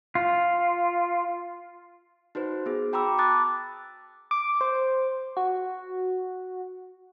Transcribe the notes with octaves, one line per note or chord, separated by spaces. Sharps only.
F4
D#4 F#4 B4 C5
B3 G#4
F#4 G5 A#5 B5 D6 E6
A5 B5 D6 D#6 F#6 A6
D6
C5
F#4